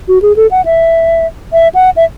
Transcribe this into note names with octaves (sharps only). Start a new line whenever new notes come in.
F#4
G#4
A4
F#5
E5
E5
F#5
E5